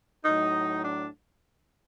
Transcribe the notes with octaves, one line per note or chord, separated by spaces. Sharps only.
A2 F#3 D#4
D4